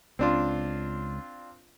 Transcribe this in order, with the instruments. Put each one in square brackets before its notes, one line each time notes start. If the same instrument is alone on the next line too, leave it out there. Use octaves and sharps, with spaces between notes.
[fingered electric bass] C#2 [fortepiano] C4 D4 F4